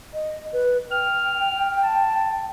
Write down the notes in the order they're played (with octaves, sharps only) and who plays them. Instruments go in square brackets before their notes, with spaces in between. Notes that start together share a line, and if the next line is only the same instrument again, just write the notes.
[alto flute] D#5
B4
[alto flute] G5 [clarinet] F6
[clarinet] A5